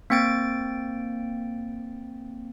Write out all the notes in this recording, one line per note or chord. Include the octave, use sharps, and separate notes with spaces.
A#3 C4 G5 A6 D7